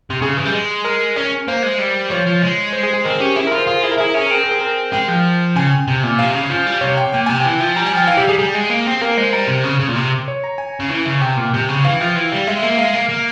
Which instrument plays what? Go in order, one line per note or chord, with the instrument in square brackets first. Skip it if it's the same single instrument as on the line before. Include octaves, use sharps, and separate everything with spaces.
[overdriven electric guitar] C3
[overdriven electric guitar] C#3 [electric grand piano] G#4
[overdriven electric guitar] E3
G3
G#3
[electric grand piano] A#4
[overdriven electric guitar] C#4
[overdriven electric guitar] A#3 [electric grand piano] C5
[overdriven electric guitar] G#3
G3
[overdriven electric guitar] F3 [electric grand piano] C#5
[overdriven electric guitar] F3
G#3
[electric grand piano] C5
G#4
G#4
[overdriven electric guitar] C4 [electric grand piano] A#4
[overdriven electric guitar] C#4 [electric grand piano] G4
[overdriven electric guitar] E4 [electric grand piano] G#4
[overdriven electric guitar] F4 [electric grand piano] A#4
[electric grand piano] C5
[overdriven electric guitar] F4 [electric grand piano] G#4
[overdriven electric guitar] E4 [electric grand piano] G#4
[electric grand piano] A#4
[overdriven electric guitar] E4 [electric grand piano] G#4
[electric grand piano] A#4
[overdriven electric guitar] C#4 [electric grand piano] G#4
[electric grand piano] A#4
[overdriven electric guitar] C4 [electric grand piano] G#4
[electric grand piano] A#4
G#4
A#4
[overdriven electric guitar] G#3 [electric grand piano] G5
[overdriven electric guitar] F3
[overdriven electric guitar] C#3 [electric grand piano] G#5
[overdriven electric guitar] C3
A#2
[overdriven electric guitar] C3 [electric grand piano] F5
[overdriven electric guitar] C#3
F3
G3
[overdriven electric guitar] C3 [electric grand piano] C#5
[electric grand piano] G5
[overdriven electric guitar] A#2 [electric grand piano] G5
[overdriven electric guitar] C3 [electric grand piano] G#5
[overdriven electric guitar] E3 [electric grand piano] G5
[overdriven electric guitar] F3
[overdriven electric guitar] G3 [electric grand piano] A#5
[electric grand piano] G#5
[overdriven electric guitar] F3 [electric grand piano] G5
[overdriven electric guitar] E3 [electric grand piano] F5
[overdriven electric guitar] G3 [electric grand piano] G4
[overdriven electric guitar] G3 [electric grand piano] G#4
[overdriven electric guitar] G3 [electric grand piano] G#4
[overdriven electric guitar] G#3
A#3
C4
[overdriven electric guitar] A#3 [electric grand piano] A#4
[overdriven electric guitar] G#3 [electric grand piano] C5
[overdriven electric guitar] G3 [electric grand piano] A#5
[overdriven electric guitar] C3
C#3
C#3
A#2
C3
[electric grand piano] C#5
A#5
G#5
[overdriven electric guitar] C#3
E3
C#3
[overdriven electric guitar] C3 [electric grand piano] G5
[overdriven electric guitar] A#2
C3
C#3
[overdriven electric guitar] E3 [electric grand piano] F5
[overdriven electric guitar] F3
E3
G3
[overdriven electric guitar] G#3 [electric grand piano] E5
[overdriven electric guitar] A#3
[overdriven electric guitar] G#3 [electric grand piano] F5
[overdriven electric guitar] A#3
A#3